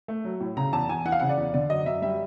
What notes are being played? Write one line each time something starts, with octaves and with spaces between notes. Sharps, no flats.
A3
F#3
A2
C#3 A#5
E2 A5
E2 G#5
E3 F#5
F5
C#3 F#5
D5
E2
D3 D5
F#2 D#5
F#2 E5
G3 E5